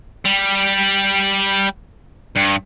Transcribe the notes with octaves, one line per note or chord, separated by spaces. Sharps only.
G3
G2